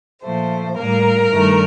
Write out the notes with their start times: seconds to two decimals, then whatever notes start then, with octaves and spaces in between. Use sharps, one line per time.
0.23 A#2 F3 A3 C5
0.78 A2 G3 A#3 A#4
1.31 G2 D#3 A3